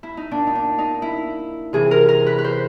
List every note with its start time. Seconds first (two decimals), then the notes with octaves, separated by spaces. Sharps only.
0.03 E4
0.17 D#4
0.31 A#2 D4
0.47 D#4
0.55 D4
0.78 D#4
1.02 E4
1.73 C3 E3 G#4
1.91 A#4
2.08 A#4
2.26 B4
2.38 B4
2.44 C5